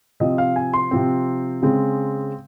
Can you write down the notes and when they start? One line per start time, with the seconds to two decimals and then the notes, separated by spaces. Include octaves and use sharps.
0.20 C3 F3 C4 D#5
0.38 F5
0.56 G#5
0.74 C6
0.91 C3 F3 C4
1.62 C#3 G#3 C4